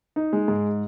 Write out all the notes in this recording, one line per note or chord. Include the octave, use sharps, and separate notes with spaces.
D#4
G#3
G#2